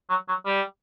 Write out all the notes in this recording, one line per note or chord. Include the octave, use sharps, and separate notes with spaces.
F#3
F#3
G3